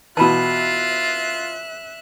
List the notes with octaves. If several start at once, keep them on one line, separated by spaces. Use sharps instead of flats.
B2 E3 F4 E5 A5 B5 F#6